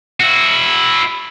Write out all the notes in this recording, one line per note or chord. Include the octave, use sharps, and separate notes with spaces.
E4 F#4